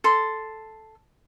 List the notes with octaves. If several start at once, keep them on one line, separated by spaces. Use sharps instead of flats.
A4 C6